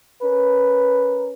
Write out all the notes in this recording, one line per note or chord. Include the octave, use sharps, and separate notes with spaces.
C#4 A#4 B4